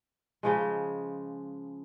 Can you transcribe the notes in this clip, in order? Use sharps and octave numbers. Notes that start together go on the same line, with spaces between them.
C#3 F3 G#3